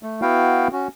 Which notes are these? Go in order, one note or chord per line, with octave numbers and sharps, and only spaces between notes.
A3
B3 E4 F#4 F5 G5
C#4 F#4